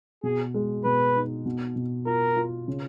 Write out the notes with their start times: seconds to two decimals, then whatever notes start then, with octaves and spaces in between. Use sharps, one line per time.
0.23 B2 G#4
0.54 G#3
0.84 B2 B4
1.16 D#4
1.46 B2
1.76 B2
2.06 F4 A#4
2.36 F4
2.68 C#3